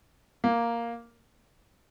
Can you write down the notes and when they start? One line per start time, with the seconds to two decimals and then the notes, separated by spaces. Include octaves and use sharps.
0.44 A#3